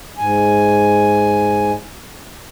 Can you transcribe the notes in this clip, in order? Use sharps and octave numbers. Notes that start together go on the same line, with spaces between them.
G#2 G#5